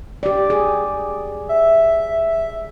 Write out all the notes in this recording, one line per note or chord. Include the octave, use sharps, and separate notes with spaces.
G4 D5
G#4
E5